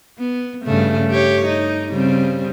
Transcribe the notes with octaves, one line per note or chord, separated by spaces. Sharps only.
B3
G2 C#3 A3
G4 C#5
D#4
C#3 G3 C4